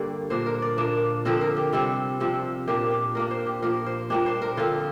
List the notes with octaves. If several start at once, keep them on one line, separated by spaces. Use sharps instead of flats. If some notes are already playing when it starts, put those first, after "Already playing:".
Already playing: G2 D3 G3 A#3 D5
A#2 A#3 D4 C5
A#4
D5
A#2 A#3 D4
D3 F3 C4 A#4
A#4
G4
C3 G3 C4
C3 F3 C4
A#2 A#3 D4 G4
G4
A#2 A#3 D4 A#4
C5
G4
A#2 F3 A#3 A#4
C5
A#2 G3 A#3 D4 G4
C5
A#4
D3 F3 C4 F4